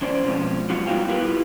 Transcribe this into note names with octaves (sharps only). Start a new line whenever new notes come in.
E2 C#4 C5 D5
B2 F3 G#3 C4 C#4
F#3 D#4 F4 F#4
G3 B3 D#4 F#4 F5 G5
E4 F4 G4 A#4 B4